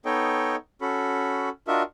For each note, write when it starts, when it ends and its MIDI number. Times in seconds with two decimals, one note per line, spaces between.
0.05 0.56 59
0.05 0.56 63
0.05 0.56 69
0.05 0.56 73
0.05 0.56 75
0.05 0.56 79
0.81 1.49 61
0.81 1.49 66
0.81 1.49 69
0.81 1.49 83
1.68 1.83 62
1.68 1.83 65
1.68 1.83 66
1.68 1.83 70
1.68 1.83 75
1.68 1.83 76